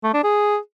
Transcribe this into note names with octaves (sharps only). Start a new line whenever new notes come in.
A3
D4
G#4